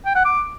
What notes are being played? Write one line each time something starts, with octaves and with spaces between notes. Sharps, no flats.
G5
F#5
D6